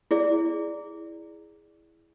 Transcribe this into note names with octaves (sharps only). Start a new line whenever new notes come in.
E4 G#4 D5